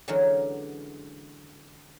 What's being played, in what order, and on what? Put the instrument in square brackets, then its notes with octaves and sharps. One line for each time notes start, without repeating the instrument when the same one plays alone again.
[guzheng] D3 E3 F#3 G#3 C#4 A#4